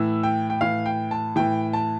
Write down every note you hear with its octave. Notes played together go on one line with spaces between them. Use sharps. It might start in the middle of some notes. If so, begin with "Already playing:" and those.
Already playing: A2 E3 E6
G5
G5
A2 E3 F5
G5
A5
A2 E3 G5
A5